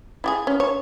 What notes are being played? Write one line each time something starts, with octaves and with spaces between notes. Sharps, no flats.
E4 G4 G#4
C#4
C#5